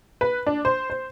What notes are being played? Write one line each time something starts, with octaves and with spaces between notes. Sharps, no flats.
B4
D4
C5
C5